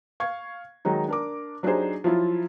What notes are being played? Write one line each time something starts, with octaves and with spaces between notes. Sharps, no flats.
F5 C#6 G#6
D#3 F#3 G#3 D#4
D4 A#4 D6
F#3 D4 D#4 G4 G#4 C5
F3 F#3 E4 F4